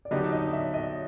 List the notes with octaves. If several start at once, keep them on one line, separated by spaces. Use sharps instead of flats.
D5
D3 F#3 B3 D#4 G4 D#5
D#5
E5
D#5